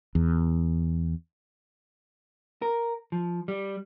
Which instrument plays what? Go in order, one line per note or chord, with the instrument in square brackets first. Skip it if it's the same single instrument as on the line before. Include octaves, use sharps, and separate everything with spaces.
[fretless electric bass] E2
[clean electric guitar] A#4
F3
G3